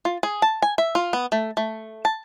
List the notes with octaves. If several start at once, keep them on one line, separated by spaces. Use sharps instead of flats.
F4
G#4
A5
G#5
E5
F4
B3
A3
A3
A5